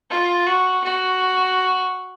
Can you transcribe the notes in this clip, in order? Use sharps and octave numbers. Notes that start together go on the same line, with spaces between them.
F4
F#4
F#4